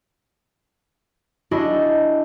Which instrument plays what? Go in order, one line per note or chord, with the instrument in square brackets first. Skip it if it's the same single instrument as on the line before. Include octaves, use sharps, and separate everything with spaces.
[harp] D4 E4 F#4 G#4 D#5